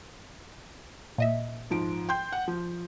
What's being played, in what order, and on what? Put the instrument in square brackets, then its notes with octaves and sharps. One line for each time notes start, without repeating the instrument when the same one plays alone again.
[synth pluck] A#2 D#5 E5
[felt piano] G#2 F3 D7
G5 C6 G6
F#5
F3